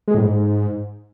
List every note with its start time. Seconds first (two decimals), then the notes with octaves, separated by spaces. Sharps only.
0.08 G#3
0.15 A2
0.22 G#2